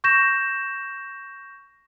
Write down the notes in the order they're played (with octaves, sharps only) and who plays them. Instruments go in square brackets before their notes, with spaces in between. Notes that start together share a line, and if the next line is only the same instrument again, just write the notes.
[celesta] C#6 G6 A#6 E7